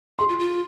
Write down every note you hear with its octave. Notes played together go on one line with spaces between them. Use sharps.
G#4 C6
F4
F4